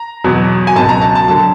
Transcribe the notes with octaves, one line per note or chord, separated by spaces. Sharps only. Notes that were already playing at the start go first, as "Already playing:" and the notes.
Already playing: A#5
E2 B2 F#3
G#5
C#2 B2 F#3 A5
A#5
A5
A5
D3 F#3 A5